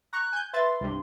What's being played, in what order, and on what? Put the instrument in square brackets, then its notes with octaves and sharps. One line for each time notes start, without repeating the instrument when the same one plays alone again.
[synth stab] A#5 C#6 [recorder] F#6
[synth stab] G#5 G6
[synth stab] B4 E5 A6 [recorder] C6
[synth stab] C2 G2